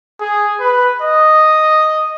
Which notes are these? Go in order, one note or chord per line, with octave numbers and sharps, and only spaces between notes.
G#4
B4
D#5